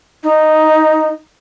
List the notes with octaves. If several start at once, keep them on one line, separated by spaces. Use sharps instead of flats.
D#4